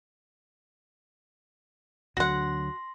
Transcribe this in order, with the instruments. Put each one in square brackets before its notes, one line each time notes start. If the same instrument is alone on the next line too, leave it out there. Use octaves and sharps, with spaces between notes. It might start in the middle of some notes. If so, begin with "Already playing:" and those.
[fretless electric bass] D2 D3 F#3 [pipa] F#4 F#5 [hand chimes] C6 A#6